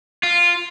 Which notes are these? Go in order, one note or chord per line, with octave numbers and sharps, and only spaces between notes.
F4